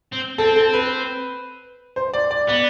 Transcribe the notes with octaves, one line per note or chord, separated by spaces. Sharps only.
C4
C4 A4
A4
B4
C5
D5
D5
B3 D5